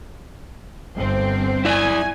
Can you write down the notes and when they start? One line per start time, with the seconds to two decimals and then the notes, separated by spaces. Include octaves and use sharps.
0.95 G1 C4
1.65 E4 D5 G#5